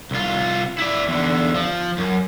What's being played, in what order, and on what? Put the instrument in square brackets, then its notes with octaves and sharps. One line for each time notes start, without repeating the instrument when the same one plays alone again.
[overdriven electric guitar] C2 F4
E4 D5
E2 D3
F3
F#2